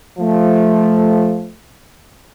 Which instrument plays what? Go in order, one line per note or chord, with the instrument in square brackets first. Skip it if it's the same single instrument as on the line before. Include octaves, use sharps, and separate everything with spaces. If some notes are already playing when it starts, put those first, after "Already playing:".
[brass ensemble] F3 A3